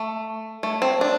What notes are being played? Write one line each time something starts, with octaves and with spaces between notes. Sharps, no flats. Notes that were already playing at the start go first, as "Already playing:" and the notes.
Already playing: A3
A3
C4
D4